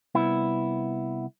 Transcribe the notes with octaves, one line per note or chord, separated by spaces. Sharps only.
C2 B3 E4